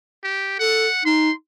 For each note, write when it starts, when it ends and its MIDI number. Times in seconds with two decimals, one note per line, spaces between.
0.24 0.55 67
0.59 0.87 69
0.59 1.05 78
1.05 1.30 63
1.05 1.33 84